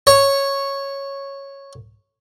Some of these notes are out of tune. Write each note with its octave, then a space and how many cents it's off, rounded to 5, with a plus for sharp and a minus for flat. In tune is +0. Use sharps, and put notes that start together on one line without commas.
C#5 -5